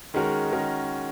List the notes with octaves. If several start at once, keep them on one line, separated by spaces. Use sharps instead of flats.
D#3 G#3 C#4 F#4 A#4
D#3 G#3 C#4 F#4 A#4